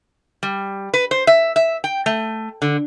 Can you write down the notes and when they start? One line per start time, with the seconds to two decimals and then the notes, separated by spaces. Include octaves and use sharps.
0.43 G3
0.94 B4
1.11 C5
1.27 E5
1.56 E5
1.84 G5
2.06 A3
2.62 D3